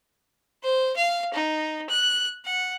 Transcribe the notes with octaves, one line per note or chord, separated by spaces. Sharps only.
C5
F5
D#4
F#6
F#5